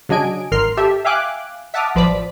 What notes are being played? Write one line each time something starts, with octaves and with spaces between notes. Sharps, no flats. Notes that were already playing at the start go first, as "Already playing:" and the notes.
C#3 F#3 D4 D#5 G#5 D7
G#1 A#4 C6 F6 C7
G4 A4 E5
E5 F5 G5 G#5 D6 F#6
E5 F#5 A5 D6 D#6 F6
A1 F3 B4 C5 D5 B6